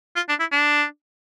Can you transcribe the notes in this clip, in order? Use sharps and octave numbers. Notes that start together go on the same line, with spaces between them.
F4
D4
E4
D4